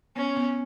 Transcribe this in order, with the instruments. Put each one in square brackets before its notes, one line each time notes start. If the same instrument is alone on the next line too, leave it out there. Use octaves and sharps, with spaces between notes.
[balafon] B3 [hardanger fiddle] C#4
[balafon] B3